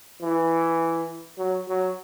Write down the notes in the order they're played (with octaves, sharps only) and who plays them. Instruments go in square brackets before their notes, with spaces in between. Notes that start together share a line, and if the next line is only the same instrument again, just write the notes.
[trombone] E3
F#3
F#3